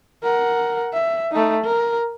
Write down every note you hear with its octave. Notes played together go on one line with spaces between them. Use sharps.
A#4 F#5
E5
A3 D#4
A#4